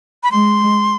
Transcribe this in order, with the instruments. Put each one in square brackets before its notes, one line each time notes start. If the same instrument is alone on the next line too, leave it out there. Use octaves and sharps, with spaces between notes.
[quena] B5
[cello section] G#3 [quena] C6